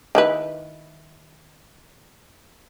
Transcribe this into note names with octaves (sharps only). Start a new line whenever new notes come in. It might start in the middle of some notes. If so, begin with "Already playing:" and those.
D#3 E4 B4